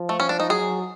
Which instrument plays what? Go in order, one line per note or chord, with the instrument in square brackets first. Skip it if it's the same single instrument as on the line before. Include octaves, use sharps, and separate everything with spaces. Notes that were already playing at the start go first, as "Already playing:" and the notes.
Already playing: [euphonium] F3
[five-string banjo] A3
C#4
D4
D#4
[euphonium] F#3 [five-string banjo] G#4